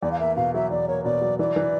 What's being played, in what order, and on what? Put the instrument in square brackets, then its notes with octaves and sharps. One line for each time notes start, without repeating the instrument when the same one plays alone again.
[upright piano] E2 [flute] D5
[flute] F5
[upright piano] A#3 [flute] E5
[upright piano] B2 [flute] F5
[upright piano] F#3 [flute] E5
[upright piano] E2 [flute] D5
[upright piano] A#3 [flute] C#5
[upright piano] B2 [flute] D5
[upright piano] F#3
[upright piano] E3 [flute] D5
[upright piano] E3